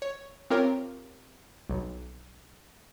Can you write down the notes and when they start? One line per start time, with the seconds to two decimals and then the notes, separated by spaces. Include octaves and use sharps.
0.02 C#5
0.50 C4 F4 G4 A#4 C#5
1.70 B1